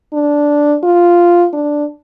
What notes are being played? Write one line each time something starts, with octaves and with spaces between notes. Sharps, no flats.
D4
F4
D4